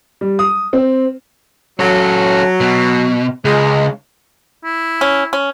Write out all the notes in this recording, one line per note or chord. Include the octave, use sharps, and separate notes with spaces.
G3
D#6
C4
F#3 C#4 A4
B2
C#2 G#3
E4
C#4
C#4